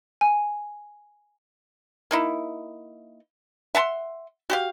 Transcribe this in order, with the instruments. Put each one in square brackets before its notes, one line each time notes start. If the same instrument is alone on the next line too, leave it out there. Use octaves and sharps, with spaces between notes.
[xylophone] G#5
[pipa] A#3 D#4 E4
E5 F#5 A5 C6
F#4 G4 F5